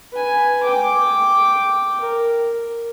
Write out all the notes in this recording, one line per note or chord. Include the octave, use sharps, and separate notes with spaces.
B4 G#5
G5 D6
A#4